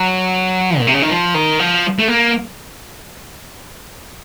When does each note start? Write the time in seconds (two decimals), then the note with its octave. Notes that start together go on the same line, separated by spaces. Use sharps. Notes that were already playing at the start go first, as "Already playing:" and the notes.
Already playing: F#3
0.79 A#2
0.87 C3
0.94 C#3
1.02 D#3
1.10 F3
1.34 D#3
1.59 F3
1.99 A3
2.08 A#3